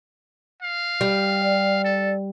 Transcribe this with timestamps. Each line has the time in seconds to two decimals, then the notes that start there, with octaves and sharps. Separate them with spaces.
0.62 F5
1.01 G3
1.42 D5
1.85 A4